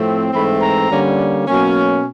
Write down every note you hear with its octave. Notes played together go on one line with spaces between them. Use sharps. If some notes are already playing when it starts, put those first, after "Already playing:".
Already playing: A2 F3 A3 C4
G#2 E3 A3 C4 B5
A#5
D3 G3 A#3 C#4
B2 F#3 A#3 C#4